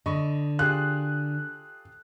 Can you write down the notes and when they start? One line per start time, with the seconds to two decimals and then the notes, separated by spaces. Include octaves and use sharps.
0.06 D3 D#5 B5 C#6
0.59 F4 G4 G#4 F#6